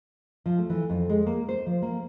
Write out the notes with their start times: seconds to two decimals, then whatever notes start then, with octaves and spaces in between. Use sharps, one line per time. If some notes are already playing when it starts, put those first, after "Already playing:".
0.46 F3
0.58 A3
0.70 E3
0.90 F2
1.09 G#3
1.26 A#3
1.49 C5
1.66 F3
1.82 A#3